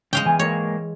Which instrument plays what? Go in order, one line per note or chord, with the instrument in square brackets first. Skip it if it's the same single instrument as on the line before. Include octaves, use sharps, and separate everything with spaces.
[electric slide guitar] C#3 [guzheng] G#3 F5 G5
[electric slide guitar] E2 G#5 [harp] E3 G#6
[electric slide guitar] G#2 G#3 A#3 [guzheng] C#5